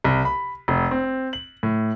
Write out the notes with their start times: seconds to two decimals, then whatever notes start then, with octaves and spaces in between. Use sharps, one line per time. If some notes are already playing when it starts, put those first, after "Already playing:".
0.04 C2
0.25 B5
0.68 F1
0.91 C4
1.33 F#7
1.63 A2